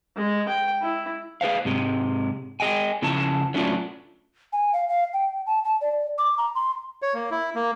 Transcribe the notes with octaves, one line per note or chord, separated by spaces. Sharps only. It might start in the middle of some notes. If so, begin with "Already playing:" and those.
G#3
G5
E4
G#4 B4 C5 F5
G#2 C3 G#3
G#4 D#5 G5 G#5
C#3 F3 C#4 E4 A5
F#3 A3 C#4 D4 E4 F4
G#5
F5
F5
G5
A5
A5
D5
D6
A#5
C6
C#5
A#3
E4
A#3